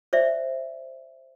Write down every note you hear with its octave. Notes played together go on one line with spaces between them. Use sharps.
C5 D5 E5